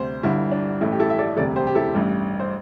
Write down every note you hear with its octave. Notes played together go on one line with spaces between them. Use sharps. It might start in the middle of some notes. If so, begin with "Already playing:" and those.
Already playing: D2 C3 G3 C5
G1 G2 D3 G3 E4
D4
A1 A2 A3 E4
G4
E4 A4
E5
A4 D5
E1 D2 C3 G3 A4 D5
G4 C5
G4
E4 A4
A1 G2 G3
C5